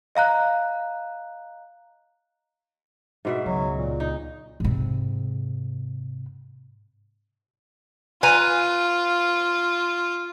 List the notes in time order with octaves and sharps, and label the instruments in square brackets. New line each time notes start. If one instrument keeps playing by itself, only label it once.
[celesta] D#5 F5 A#5 F#6
[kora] G#2 B2 E5
[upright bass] C#2 [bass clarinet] F#3
[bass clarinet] A#2
[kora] D#4
[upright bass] G#2 C3
[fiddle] F4 [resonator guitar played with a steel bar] B4 G#5 A#5